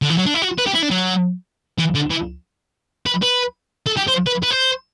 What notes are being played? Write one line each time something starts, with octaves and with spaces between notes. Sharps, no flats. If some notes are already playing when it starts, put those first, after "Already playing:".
D3
E3
F#3
D4
E4
F#4
B4
G4
E4
D4
F#3
E3
D3
E3
B4
B4
A4
G4
C5
B4
B4
C5